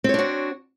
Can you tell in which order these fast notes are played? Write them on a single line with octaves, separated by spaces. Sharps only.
C4 C#5 D4 F#4